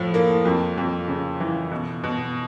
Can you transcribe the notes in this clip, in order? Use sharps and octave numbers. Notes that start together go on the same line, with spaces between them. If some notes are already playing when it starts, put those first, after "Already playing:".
Already playing: A2 F3
A#3
F2
F2
C#3
E3
B2
B2